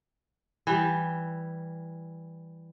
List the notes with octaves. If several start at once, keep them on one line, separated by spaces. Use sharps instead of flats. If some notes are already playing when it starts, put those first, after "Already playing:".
E3 G3